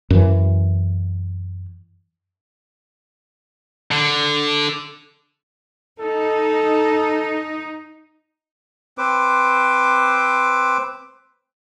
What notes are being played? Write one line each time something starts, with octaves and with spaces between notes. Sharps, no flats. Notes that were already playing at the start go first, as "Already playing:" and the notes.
F#2 E3
D3
D#4 A4
C4 B4 C5 D6